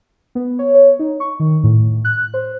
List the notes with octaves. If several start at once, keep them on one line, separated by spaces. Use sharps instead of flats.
B3
C#5
C#5
D#4
C#6
D#3
A2
F#6
C5